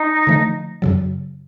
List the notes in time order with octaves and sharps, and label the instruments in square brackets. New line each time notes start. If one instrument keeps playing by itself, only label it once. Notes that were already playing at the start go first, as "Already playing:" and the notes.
Already playing: [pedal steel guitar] D#4
[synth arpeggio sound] D3 F3 A3
F#2 C#3 F#3